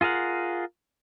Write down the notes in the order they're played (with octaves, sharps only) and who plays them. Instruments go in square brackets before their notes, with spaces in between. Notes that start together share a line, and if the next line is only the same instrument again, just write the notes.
[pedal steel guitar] F4 G#4 A#4 F5 F#5